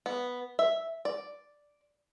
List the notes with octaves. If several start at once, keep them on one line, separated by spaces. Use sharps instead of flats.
B3
E5
D5